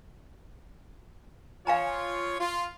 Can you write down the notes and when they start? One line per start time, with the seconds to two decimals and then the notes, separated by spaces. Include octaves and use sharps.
1.67 F3 F4 C#5 F5 G#5 A#5
2.40 F4